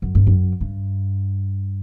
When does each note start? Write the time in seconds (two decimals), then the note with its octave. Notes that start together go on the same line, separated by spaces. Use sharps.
0.02 F#2
0.15 G2
0.27 F#2
0.61 G2